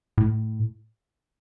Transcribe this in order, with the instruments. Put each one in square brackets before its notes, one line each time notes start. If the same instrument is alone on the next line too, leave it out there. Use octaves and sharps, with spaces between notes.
[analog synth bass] A2